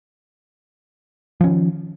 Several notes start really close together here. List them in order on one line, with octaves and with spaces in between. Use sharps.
F3 C#4 D#3